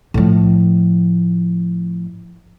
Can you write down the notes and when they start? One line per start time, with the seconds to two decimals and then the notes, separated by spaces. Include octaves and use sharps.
0.14 A2 F3